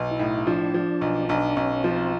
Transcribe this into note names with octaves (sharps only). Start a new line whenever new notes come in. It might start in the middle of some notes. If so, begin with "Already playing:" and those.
Already playing: B1
E4
A2 D#4
F3 D4
F3
B1
B1 D4
B1 C#4
F3 C4